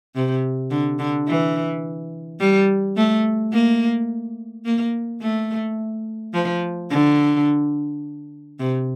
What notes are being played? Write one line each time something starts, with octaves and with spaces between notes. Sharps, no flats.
C3
D3
D3
E3
G3
A3
A#3
A#3
A3
F3
D3
C3